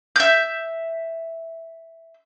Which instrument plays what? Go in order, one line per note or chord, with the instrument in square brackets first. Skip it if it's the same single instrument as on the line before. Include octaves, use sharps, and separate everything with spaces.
[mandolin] E5 G6